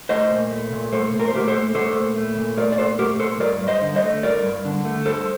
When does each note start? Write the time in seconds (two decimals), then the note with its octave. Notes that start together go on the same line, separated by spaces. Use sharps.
0.09 A3 C5 D#5
0.31 A#2
0.51 A3
0.72 A#2
0.92 A3 A4 C5
1.13 A#2
1.20 A#4
1.28 C5
1.34 A3 G4 A#4
1.48 A4 C5
1.55 A#2
1.75 A3 A4 C5
1.96 A#2
2.16 A3
2.38 A#2
2.57 A3 A#4 D5
2.72 D5
2.78 A#2 A4 C5
2.99 A3 G4 A#4
3.20 A#2 A4 C5
3.40 G2 A#4 D5
3.62 G2
3.68 C5 D#5
3.82 D3
3.96 C5 D#5
4.02 A3
4.23 G2 A#4 D5
4.44 G2
4.65 D3
4.85 A3
5.06 G2 A4 C5